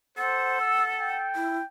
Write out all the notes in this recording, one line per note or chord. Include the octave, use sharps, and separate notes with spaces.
A4 C5 F#5
E6
G5
E4